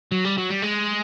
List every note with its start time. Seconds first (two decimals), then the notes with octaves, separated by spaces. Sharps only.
0.12 F#3
0.25 G3
0.38 F#3
0.49 G3
0.62 G#3